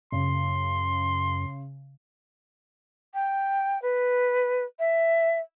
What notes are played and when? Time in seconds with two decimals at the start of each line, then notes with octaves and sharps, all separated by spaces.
0.12 F#2 C#3 C6
3.14 G5
3.82 B4
4.79 E5